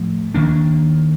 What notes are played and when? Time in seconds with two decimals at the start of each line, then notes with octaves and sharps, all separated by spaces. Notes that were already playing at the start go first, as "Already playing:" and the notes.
Already playing: A2 F3 A3
0.34 D#3 A#3 D4